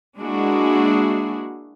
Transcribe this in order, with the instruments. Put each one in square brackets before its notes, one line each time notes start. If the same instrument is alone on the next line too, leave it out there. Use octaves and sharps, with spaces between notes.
[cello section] G#3 A#3 D4 E4 F#4 G#4